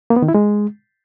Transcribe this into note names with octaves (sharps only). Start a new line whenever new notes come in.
A#3
B3
D#3
E4
G#3